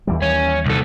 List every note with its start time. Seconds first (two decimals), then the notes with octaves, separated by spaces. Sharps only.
0.07 D#2 E3 G3
0.22 C#4
0.66 C2 A4